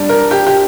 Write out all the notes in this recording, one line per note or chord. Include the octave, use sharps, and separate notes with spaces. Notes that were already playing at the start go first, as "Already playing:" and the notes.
Already playing: G3 D4
A#4
G4
G4